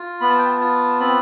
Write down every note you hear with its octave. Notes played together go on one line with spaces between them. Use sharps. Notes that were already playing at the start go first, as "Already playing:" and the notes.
Already playing: F4
B3 B5
A5
G5
A5
F4
C4 B5